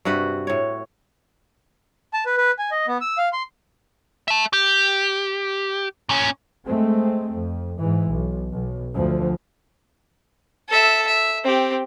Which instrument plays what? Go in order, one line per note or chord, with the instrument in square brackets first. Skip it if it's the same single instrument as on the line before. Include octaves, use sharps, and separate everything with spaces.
[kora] G2 C3 F#4 B4
A2 C#5
[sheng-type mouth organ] A5
B4
B4
G#5
D#5
B3
E6
F5
C6
[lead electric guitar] E5 A5
G4
A#2 C#4
[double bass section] G#3 A3 C4
F2
G#2 E3
B1
B1
D2 F3
[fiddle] A4 E5
E5
C4 G4